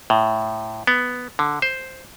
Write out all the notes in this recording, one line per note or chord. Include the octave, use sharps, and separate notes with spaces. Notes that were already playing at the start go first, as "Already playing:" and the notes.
A2
B3
D3
C5